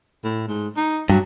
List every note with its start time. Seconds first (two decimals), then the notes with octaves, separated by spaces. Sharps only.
0.24 A2
0.48 G#2
0.77 D#4
1.10 G2 F#3